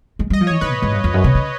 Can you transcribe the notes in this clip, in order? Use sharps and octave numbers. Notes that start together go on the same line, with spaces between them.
G#3
G3 D#5
F3
C#5
E3
D#3 B4
A2
G#2
G2
F2
F#2
C3
C#3